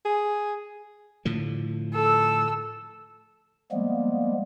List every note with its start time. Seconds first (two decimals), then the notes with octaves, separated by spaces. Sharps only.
0.05 G#4
1.25 A2 D3 F3
1.93 A4 E6
3.71 F3 G3 G#3 A#3 B3